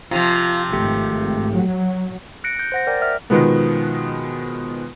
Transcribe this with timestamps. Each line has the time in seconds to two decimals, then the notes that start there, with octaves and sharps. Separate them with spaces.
0.11 C3 F3 F4
0.73 G#1 A3 G4
1.54 F#3
2.44 F#6 A#6 C#7 D7
2.59 G6
2.72 C5 F#5 A#6
2.87 A#4 D5 G5
3.02 E5 F6
3.30 B2 D#3 F3 G#3 B3